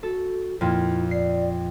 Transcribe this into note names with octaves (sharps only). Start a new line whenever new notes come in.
F#4 A4
F2 A#2 E4
D5 C7